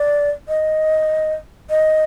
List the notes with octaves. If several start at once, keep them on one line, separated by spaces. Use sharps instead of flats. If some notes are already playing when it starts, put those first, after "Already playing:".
Already playing: D5
D#5
D#5